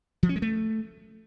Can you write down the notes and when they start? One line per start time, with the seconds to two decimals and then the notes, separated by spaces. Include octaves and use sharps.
0.23 F3
0.29 C#4
0.36 G#3
0.42 A3